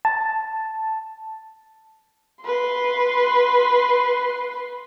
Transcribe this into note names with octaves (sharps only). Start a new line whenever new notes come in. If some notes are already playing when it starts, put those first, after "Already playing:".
A5
B4 C6